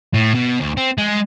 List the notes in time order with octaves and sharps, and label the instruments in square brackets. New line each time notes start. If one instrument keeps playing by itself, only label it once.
[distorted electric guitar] A2
B2
D2
C4
G#3